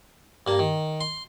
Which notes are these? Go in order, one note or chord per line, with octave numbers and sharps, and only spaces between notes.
G2 A#3
D#3
C6